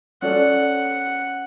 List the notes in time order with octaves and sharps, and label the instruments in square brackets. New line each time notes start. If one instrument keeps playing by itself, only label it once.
[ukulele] C#4 A4 D5 [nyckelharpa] F#5